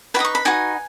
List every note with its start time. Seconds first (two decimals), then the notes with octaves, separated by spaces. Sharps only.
0.14 F#4 B4 B5
0.19 D#4 D#6
0.25 C#6
0.35 B5
0.45 D#4 F#4 B4 G#5